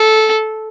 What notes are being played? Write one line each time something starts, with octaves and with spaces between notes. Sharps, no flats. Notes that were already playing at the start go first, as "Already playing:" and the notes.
Already playing: A4